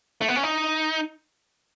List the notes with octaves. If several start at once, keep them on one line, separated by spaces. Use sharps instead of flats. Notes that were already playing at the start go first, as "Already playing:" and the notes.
A3
B3
C#4
D#4